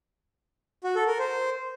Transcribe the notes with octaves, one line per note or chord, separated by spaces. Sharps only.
F#4
A4
A#4
C5